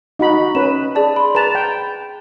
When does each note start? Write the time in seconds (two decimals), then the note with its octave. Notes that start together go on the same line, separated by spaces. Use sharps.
0.19 D#4 F#4 B5
0.55 C#4 B4 E7
0.95 G#4 D5 A5
1.16 B5 C6
1.35 B4 A5 A#5 E7 F7
1.55 G5